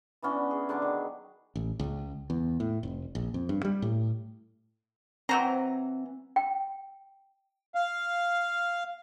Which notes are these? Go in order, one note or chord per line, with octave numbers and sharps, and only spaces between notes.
E3 B3 C#4 D4
G#4
D3 F#3 D4 D6
D#3
A1
C#2
E2
A2
F1
A#1
F2
G2
G3
A2
E3 F#3 C4 A#5
G5
F5